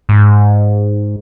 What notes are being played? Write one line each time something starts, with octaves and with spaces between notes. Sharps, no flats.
G#2